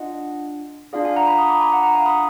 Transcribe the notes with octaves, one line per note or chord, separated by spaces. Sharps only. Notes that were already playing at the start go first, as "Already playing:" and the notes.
Already playing: D4 F4 D#5 F#5
D4 F4 G#4 D5 F5
F5 G#5
F#5 A#5
G#5 B5
B5 D#6
A#5 D6
G#5 B5
F#5 A#5
F#5 A#5
F5 G#5
B5 D#6